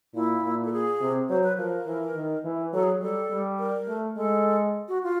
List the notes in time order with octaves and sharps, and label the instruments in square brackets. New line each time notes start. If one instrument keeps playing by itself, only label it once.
[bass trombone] A#2 [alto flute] E4
[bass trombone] A#2
[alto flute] A4
G#4
[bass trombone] C3
[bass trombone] F#3 [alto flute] C5
[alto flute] B4
[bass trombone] F3 [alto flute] A#4
[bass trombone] E3
D#3
E3
[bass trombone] F#3 [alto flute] A4
[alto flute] G#4
[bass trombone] G3 [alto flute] A4
[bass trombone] G3
[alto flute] A#4
[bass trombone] A3
[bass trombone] G#3 [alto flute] A4
[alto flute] F#4
F4